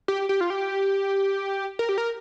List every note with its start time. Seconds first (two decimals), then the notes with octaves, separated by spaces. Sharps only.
0.08 G4
0.29 G4
0.41 F4
0.50 G4
1.79 A#4
1.89 G4
1.98 A#4